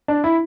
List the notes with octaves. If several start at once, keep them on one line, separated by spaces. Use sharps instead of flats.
D4
E4